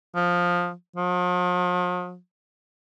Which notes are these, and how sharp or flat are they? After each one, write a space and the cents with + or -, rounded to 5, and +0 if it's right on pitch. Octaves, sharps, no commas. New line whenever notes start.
F3 +10
F3 +45